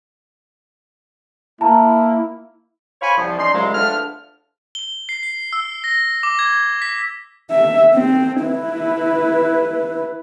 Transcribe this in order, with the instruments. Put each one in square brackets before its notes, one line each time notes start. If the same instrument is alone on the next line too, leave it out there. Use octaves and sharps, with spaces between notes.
[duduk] A#3 [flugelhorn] E4 [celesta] A5 A#5
[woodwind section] C5 C#5 F5 G#5 B5 C#6
C2 F3
C#4 D#4 D5 C6
C2 C#3 F3 F#3 G#3
E2 F3 A3 D4 F6
[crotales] G7
C7
C7
E6
A#6
D6
G#6
B6
[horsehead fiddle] E5
C4
E4 B4